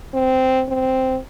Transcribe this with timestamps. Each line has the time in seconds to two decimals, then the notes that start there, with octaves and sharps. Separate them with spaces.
0.14 C4
0.68 C4